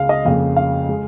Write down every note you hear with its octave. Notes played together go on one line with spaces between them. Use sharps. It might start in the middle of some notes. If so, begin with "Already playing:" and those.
Already playing: C#2 C#3 G#3 F5
D#5
F2 C#3 A#3 F5
F5
G#3